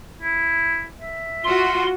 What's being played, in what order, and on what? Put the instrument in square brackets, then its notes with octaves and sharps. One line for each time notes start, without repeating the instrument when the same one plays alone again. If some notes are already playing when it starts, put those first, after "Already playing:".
[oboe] E4
E5
[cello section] F4 F#4 [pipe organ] C6